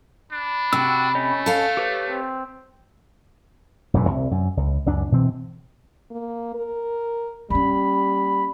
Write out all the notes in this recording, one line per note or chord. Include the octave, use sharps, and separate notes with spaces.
D4 B5
C3 F#4 G5 E6
A3 C#4 C#5 D#5
A4 F5
G4 B4 C#5
C4
E1 F#2 A#2 E3
C2
F#2
C#2
C#2 F#2 D4
B2 E3 C4
A#3
A#4
G3 A#3 C#4 B5